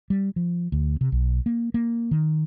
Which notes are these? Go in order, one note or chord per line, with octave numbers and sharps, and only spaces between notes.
G3
F3
D2
C3
B1
A#3
A#3
D#3